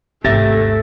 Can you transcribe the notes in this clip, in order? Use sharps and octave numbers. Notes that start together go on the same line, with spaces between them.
G#1 D#2 C3 A3 G4 E5 A6 A#6